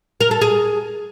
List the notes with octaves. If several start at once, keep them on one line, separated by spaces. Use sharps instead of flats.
A#4
A4
G#4